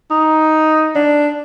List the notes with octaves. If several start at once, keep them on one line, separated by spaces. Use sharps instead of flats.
D#4
D4